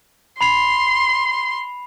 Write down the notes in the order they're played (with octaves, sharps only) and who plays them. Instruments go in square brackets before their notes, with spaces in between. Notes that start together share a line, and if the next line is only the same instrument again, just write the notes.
[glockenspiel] B5 C7 F7 [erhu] C6